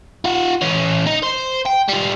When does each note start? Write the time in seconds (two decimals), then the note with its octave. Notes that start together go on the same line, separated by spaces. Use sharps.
0.25 F4 F#5
0.62 E3 C#4
1.07 D#4
1.23 C5
1.66 G5
1.89 G3 F4